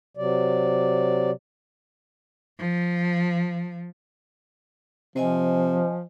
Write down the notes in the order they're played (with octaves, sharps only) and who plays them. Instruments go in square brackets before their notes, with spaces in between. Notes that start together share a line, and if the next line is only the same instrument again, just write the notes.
[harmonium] C3 F#3 D5
[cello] F3
[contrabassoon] C3 [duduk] F3 [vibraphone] C5 D#5 G#5